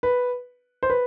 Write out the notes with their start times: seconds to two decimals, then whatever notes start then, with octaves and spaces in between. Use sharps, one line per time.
0.03 B4
0.83 C5
0.90 B4